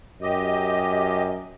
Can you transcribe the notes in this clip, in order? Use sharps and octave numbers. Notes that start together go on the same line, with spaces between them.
F#2 G4 D#5